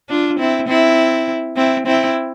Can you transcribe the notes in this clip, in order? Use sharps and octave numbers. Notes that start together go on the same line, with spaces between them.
D4 F4
C4 E4
C4 E4
C4 E4
C4 E4